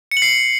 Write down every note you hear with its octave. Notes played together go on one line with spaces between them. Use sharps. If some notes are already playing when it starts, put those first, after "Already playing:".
C#7
F#7
C7